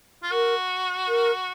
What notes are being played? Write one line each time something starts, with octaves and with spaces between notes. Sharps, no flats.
F4
F#4 A#4
A#4